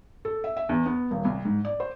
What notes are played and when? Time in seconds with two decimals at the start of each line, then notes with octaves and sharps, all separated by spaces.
0.25 A4
0.44 E5
0.57 E5
0.69 E2
0.86 B3
1.11 D#1
1.25 C2
1.45 G#2
1.65 D5
1.80 C5